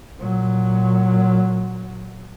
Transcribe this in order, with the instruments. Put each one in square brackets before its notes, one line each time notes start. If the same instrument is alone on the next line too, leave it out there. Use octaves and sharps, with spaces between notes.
[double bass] A#2 F#3